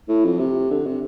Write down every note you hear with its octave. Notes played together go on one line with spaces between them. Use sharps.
A2
F2
C3
D3
C3